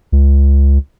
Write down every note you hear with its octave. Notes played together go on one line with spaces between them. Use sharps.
C#2